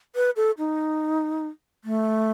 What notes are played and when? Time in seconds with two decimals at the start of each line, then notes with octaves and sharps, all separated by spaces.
0.16 B4
0.36 A4
0.58 D#4
1.84 A3